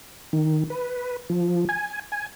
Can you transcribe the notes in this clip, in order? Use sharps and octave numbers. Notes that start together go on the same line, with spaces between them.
D#3
B4
F3
G#5
G#5